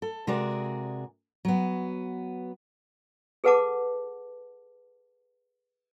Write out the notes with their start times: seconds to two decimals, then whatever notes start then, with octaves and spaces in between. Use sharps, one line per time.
0.02 A4
0.27 C3 G#3 F#4 G#4 A#4 D5
1.45 F#3 B3
3.44 G#4 A4 B4 F#5 A5 D6